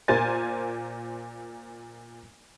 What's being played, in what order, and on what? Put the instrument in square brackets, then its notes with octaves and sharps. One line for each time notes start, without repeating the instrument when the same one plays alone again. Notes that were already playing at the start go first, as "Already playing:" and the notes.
[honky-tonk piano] A#2 A#4 C5 G#5 A6